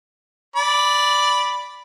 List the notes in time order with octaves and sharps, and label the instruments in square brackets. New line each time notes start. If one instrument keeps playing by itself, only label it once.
[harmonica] D5 B5